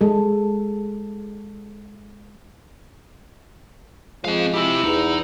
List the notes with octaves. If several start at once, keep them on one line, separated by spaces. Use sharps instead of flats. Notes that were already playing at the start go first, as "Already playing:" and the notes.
G#3 A4
F3 G#3 C4 F5
C4 E4 G4
E2 D#4